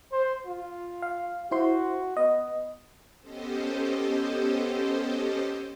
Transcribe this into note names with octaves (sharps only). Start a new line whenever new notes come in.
C5
F4
F5
E4 F#4 C5 C6
B3 D#5
B3 C#4 G4 A4 C5 D#5